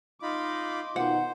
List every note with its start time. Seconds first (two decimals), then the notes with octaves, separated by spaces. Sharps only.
0.22 D#4 F4 B5 C6 D6
0.96 B2 D#3 F4 C5 F#5